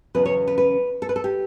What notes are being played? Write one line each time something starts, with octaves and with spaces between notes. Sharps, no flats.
E2 C#3 F#3 C#4 B4
C#5
B4
B4
A4
B4
A4
G4